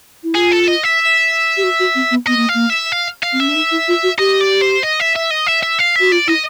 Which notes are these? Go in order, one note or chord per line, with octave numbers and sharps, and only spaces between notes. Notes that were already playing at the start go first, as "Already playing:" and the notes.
E4
F4 G#4
A4
D#5
E5
G4
F#4
F#4
C4
B3
B3 D#5
A#3
F5
A#3
E5
F5
F5
C4
C#4 E5
D4
D#4
E4
F4
F#4
G4 D#5
D5
C5
D#5
E5
E5
D#5
E5
E5
F5
F#4 E5
F4 D5
E4 D#5